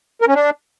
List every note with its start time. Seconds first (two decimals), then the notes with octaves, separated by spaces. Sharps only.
0.22 A#4
0.28 C#4
0.34 D4